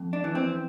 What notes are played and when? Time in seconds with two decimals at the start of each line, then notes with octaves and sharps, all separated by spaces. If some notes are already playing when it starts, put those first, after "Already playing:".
Already playing: F2
0.13 D4
0.24 E3
0.35 C4